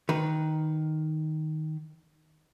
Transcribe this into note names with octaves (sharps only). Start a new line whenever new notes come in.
D#3 B4